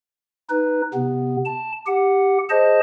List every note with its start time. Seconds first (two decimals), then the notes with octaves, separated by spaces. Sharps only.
0.50 D#4 B4
0.94 C3 B3
1.46 A5
1.87 G4 F#5
2.50 G#4 C5 D#5 A5